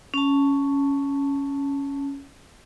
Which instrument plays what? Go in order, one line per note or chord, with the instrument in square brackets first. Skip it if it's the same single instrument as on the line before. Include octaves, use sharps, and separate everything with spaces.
[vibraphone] C#4 A5